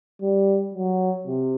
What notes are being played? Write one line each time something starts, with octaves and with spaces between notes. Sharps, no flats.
G3
F#3
C3